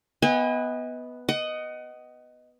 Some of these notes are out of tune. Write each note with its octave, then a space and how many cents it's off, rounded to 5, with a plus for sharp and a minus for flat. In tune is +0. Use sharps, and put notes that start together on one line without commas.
B3 +0 D#5 +35 G#5 -35
D#5 +0 F#5 +25